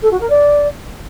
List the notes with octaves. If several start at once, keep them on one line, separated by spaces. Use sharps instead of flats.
A4
F#4
A#4
D5